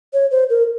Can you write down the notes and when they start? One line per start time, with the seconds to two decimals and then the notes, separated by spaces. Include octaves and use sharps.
0.13 C#5
0.31 C5
0.50 A#4